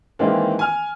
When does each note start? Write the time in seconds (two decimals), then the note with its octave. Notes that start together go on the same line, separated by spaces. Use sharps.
0.19 D#3 E3 G#3 A#3 C4 D4
0.59 G#5 F6